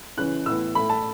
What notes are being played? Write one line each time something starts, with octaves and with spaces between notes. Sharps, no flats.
C#3 E3 C#4 E4 F#6
A2 E3 B3 E4 E6
A2 A3 E4 B5
A5